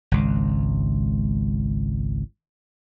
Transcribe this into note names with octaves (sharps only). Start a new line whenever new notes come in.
G#1 C#2